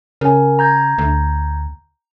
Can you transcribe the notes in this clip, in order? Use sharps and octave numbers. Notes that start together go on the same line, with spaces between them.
C#3 A#4 G#5
A#5 G6 G#6
D2